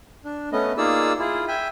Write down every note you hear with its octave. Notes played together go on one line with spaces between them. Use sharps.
D4
A3 B3 C#4 D#5
A#3 D#4 F4 G#4 D5 E6
E4 F4 G#4
E5 G5 G#5